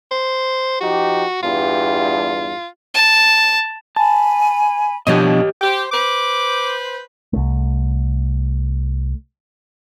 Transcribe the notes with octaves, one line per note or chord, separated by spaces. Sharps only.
C5
F3 D#4 F#4 G4
E2 G2 F4
A5
G#5 A5 B5
B2 F3 D4 G4 C#5 D#5
G4 C5
B4 C5 D6
C2 A3